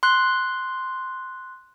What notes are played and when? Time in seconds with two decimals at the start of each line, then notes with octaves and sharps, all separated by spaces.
0.03 C6 F#6